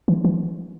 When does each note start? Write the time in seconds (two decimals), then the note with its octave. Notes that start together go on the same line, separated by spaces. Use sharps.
0.08 E3
0.25 E3